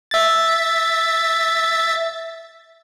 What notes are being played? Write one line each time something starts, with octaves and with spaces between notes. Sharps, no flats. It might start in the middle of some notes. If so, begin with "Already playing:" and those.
E5 A6